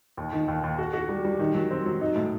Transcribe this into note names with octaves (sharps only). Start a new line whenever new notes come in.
D#2
D#3
D#2
D#2
F#4
F#4
G3
G3
D#3
F#3
C4
F#3
D#4
A2